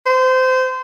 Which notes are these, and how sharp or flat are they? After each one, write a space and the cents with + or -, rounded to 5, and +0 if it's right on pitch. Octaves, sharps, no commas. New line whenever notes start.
C5 -25